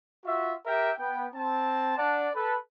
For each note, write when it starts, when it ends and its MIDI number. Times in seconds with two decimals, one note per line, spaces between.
0.24 0.53 65
0.24 0.53 66
0.24 0.53 76
0.66 0.91 67
0.66 0.91 70
0.66 0.91 76
0.66 0.91 79
0.98 1.25 59
0.98 1.25 79
1.34 1.96 60
1.34 1.96 81
1.98 2.28 62
1.98 2.28 74
1.98 2.28 78
1.98 2.28 81
2.35 2.55 69
2.35 2.55 71